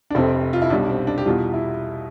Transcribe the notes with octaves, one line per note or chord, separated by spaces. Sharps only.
D4
F1 F2 C3 C4
F4
E4
B1 B2 G3 D4
C4
D4
G4
E2 B2 G3 F4
E4